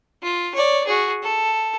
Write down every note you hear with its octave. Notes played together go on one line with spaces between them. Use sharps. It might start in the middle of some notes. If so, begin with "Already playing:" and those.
F4
C#5 D5
F#4 G#4
A4